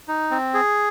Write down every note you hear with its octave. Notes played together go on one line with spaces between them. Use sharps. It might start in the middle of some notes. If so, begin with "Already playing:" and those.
D#4
C4
G#4